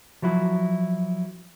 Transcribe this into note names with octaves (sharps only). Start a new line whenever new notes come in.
F3 F#3 E4 F#4